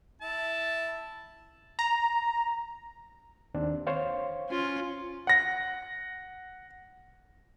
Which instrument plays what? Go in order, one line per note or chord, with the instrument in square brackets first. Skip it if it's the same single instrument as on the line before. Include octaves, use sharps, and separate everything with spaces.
[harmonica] E4 A5
[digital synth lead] A#5
[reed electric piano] D#2 C4 D4
C5 C#5 F5
[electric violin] C#4 F4
[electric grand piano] F#5 A#6